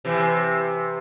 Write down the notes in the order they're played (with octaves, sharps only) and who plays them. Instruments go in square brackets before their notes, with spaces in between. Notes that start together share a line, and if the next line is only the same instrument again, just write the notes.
[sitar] C3 E3